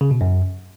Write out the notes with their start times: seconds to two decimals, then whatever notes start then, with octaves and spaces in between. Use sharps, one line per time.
0.01 C#3
0.11 B2
0.21 F#2